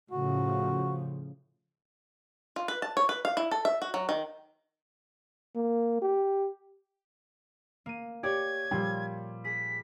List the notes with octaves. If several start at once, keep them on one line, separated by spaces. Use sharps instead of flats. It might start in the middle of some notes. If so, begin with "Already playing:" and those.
A2 C#3 F3 F#4
F4
B4
A5
C#5
B4
F5
E4
A4
E5
F#4
F#3
D#3
A#3
G4
A#3 D#7
G4 C#5 D5 G#6
A#2 F3 G3 A4
G#4 B6